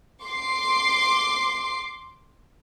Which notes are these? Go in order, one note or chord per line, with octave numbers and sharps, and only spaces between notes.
C6 D6 C7